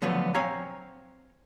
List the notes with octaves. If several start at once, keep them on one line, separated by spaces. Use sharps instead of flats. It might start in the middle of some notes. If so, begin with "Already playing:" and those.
D3 F3 F#3 A3 B3
C4 C#5 F5 G#5 A#5